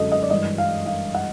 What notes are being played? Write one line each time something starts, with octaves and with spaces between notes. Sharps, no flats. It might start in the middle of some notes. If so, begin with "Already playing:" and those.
Already playing: F#2 D3 G#3 A4 D#5
D#5
D5
G2 E3 G#3 D#5
F5
F5
F#5